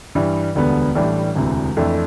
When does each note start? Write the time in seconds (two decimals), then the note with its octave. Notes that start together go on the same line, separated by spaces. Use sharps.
0.15 G2 E3 G3
0.55 E1 D2 D3 G3 B3
0.95 A1 A2 E3 G3 D4
1.35 E1 D2 C3 E3
1.77 F2 E3 A3 D4